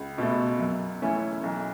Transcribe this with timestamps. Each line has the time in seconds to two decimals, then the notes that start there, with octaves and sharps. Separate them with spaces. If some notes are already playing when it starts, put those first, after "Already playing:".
Already playing: C#2
0.18 B2 A3
0.59 F#2
1.02 E3 A3 C#4 E4
1.43 B1